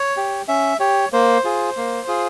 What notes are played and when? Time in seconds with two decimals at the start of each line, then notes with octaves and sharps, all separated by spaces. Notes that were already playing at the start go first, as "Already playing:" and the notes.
Already playing: C#5
0.17 G4
0.48 C#4 E5
0.80 G4 C#5
1.12 A#3 C5
1.44 F4 G#4
1.77 A#3
2.08 F4 G#4